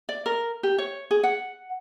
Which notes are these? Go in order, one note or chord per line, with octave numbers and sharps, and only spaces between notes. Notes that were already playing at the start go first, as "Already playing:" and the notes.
D5
A#4
G4
C#5
G#4
F#5